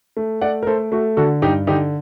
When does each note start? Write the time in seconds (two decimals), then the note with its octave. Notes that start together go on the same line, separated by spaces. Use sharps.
0.17 A3
0.41 A3 D5 F#5
0.63 A#4
0.67 A3 A4 C5
0.92 A3 F#4 A4
1.17 D3 F#4 A4
1.42 G2 D#4 G4
1.67 D3 D#4 G4